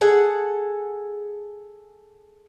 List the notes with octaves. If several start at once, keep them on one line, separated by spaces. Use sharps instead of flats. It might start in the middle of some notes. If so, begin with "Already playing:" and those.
G#4 A4 F#5